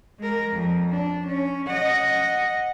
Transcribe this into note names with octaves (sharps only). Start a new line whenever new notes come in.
G#3 A#4
F2
D4
C#4
D#5 F#5